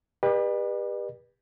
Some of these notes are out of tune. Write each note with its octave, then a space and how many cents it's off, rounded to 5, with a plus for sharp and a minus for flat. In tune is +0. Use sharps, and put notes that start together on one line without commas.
G4 +30 B4 -25 D5 +45